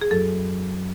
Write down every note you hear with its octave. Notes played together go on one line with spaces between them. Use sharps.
G#4
F#2 A4